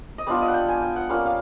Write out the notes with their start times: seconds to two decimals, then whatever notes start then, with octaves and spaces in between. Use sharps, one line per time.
0.18 D#5
0.27 G3 B3 D4 F4 D5
0.41 D#5
0.48 F#5
0.54 G5
0.68 G#5
0.82 G5
0.96 F#5
1.09 G3 A#3 C#4 F4 F5
1.26 F5